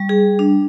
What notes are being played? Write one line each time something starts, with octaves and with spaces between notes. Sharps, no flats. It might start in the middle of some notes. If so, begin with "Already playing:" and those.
Already playing: G3
G#4
D4